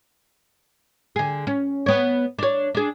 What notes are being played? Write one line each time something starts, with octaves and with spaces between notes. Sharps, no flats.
D3 G#4
C#4
B3 C#5
D4 C#5
D4 G#4